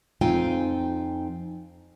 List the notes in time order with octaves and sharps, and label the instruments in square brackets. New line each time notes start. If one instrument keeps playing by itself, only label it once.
[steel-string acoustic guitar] F2 C4 D#4 F4 G5 G#5